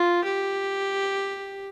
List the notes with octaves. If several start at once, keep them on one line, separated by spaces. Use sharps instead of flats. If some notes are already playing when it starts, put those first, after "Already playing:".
Already playing: F4
G4